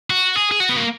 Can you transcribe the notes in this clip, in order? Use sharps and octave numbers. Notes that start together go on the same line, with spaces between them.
F#4
G#4
G#4
F#4
B3
A#3